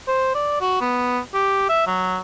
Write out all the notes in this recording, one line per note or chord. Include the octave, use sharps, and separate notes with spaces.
C5
D5
F#4
B3
G4
E5
F#3